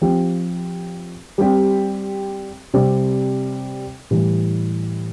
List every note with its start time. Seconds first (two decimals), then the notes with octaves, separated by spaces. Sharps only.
0.01 F3 C4 G4
1.38 G3 C4 G4
2.74 C3 G3 C4
4.11 A2 E3 G3